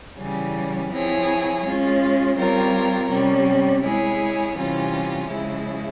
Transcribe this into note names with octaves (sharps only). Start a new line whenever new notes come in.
C#3 E3 G3 C#4
F3 C4 E4 G#4 C#5
G#3 C#4 F4
G3 C4 F4 A#4 C#5
C3 G3 C#4
G#3 E4 G#4 C#5
C3 E3 G3 C#4 F4
C#3 F3 G#3 E4